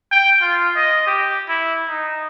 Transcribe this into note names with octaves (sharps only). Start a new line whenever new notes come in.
G5
F4
D#5
G4
E4
D#4